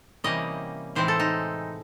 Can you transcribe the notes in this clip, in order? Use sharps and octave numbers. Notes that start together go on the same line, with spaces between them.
C3 E3 G3 A#3 C#4 D#5
A2 E3 G#3 C4 D#4 C5
A4
D#4